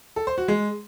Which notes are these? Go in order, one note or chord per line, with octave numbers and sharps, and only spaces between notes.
A4
C5
F#4
G#3